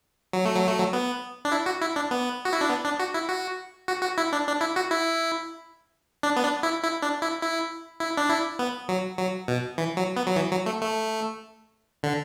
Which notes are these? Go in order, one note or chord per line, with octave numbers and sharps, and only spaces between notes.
F#3
A3
F#3
A3
F#3
B3
D4
E4
F#4
E4
D4
B3
F#4
E4
D4
B3
D4
F#4
E4
F#4
F#4
F#4
E4
D4
D4
E4
F#4
E4
D4
B3
D4
E4
E4
D4
E4
E4
E4
D4
E4
B3
F#3
F#3
B2
E3
F#3
B3
F#3
E3
F#3
A3
A3
D3